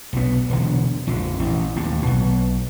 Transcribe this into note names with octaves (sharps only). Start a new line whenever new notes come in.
B1 B3
E1 D3
A#1 F2 D3
A1
D#2 A2
B1 B2